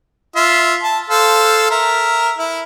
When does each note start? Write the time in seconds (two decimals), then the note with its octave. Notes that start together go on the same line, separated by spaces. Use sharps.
0.36 F4 E5
0.83 A5
1.10 A4 C5 F5
1.71 A#4 E5
2.38 E4